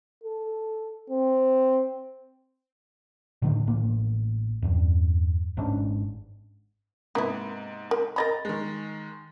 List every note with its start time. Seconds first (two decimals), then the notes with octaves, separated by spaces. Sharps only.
0.24 A4
1.10 C4
3.42 A2 D3 D#3
3.67 A1 A#3
4.62 E2 G2
5.57 G#1 G#2 C#4 D4
7.15 G#2 C3 A#3 B3 E4
7.91 A#4
8.16 A#4 D#5 A#5 B5 A6 A#6
8.45 D#3 G#3